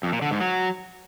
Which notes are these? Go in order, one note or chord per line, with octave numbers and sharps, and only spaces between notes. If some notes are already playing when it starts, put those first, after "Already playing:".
F2
A#2
D3
G#2
F#3